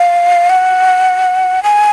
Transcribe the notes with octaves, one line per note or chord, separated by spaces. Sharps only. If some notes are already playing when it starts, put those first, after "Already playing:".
Already playing: F5
F#5
G#5